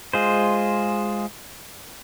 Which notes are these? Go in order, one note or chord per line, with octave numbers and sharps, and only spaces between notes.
G#3 F4 G#4 C5